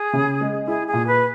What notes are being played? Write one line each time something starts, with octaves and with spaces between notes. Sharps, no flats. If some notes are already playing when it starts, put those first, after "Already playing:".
Already playing: G#4
C#3
G#3
E4 G#4
G#4
A#2
B4